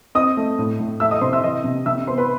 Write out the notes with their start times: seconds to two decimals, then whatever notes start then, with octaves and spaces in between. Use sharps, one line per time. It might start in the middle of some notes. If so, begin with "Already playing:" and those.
0.15 C4 D#5 D#6
0.37 A3
0.58 A2
0.80 A2
1.00 A3 E5 E6
1.11 D#5 D#6
1.21 C3 C5 C6
1.32 E5 E6
1.43 E3 D#5 D#6
1.64 C3
1.86 C3 E5 E6
2.07 B3 C5 C6
2.18 B4 B5